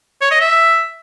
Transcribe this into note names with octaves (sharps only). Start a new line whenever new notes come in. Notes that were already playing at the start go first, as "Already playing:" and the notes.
C#5
D#5
E5